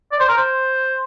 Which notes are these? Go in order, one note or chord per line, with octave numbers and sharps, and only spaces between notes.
D5
C5
A#4
C5